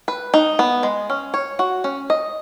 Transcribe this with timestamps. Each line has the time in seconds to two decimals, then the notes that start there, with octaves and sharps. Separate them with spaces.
0.08 B4
0.34 D#4
0.59 B3
0.83 G#3
1.10 C#4
1.34 C#5
1.59 F#4
1.84 C#4
2.10 D#5